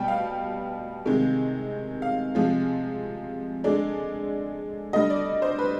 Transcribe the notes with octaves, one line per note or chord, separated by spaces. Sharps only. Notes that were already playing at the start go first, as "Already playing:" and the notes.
Already playing: B2 G3 G5
F5
C3 D#3 G#3
F5
C3 F3 G#3
D3 G#3 D5
D3 G3 D#5
D5
C5
B4